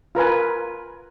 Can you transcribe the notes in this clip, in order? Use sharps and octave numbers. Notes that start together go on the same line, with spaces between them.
F4 A#4 B4 G#5